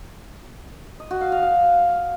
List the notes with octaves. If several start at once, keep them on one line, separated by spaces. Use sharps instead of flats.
D#5
F#4
F5
F5
F5